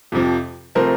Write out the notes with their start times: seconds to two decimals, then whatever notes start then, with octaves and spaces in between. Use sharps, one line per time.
0.12 F2 C3 F3
0.75 C3 F3 A3 A#4 C5